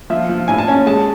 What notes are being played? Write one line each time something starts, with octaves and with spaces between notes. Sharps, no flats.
F3 E5
F3
A2 G#5
A5
C#4 G#5
G#3 A5